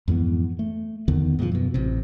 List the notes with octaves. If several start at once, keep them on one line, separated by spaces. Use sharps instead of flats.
F2 G#2 E3 B3
A3
E2 D3 D#3 B3
G#2 B2 E3 F3
F#2 B2
A1 C3